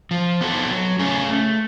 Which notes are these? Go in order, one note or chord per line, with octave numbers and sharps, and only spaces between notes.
F3
B3 F#4 A4
F#3
A3 C#4 G#4
A3